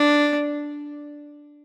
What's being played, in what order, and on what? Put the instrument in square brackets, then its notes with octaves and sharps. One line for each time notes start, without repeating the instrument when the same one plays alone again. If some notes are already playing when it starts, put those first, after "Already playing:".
Already playing: [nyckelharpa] D4